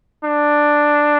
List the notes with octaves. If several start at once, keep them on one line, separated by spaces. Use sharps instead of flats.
D4